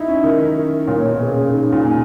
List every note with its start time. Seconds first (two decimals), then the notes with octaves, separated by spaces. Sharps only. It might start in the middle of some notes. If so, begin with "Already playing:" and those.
Already playing: D#4 E4 E5
0.08 C#4
0.24 D#3 A#4
0.56 A#4
0.88 A#2 C#5
1.09 B2
1.19 G#4
1.30 C#3
1.51 C#3 D#4
1.73 A#2
1.83 G#5